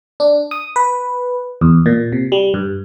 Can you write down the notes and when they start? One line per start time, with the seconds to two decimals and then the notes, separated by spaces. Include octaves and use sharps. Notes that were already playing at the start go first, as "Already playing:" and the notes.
0.20 D4
0.51 D#6
0.76 B4
1.61 E2
1.86 A#2
2.12 C3
2.32 G3
2.54 G2